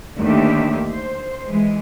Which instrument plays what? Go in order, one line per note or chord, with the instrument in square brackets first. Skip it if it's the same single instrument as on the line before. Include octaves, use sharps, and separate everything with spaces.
[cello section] D#2 D3 D#3 A3 G4 E5
C5
E3 G#3